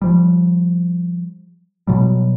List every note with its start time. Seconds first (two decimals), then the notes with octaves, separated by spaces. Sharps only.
0.02 F3 G3
1.87 B2 F#3 G3